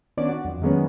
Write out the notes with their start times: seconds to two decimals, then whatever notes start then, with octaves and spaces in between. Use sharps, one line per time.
0.17 D#3 B3 C#4 D4 D5
0.29 F#4
0.45 F2 F3
0.62 D#3 F#3 G#3 A#3 B3 C#4